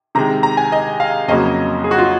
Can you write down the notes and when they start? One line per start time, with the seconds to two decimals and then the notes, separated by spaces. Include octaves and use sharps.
0.15 C3 D#3 G#3 A#5
0.43 A#5
0.57 G#5
0.72 D#5
1.00 F5
1.28 F2 C#3 F#3 A#3 C#4 D#5
1.84 G#4
1.91 F#4
1.98 F4